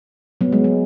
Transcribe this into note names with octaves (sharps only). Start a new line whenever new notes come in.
F#3 B3
G#3
F#3